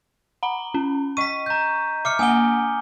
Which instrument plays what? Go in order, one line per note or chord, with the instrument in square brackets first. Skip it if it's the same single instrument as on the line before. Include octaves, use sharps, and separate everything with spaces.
[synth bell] F#5 A#5 B5
C#4
[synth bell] D#5 C#6 [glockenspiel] B6 D#7
[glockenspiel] A#5 G6
[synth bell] E5 [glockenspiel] D6 F6 C#7
[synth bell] A#3 F#5 [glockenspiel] G#5 D#6 G7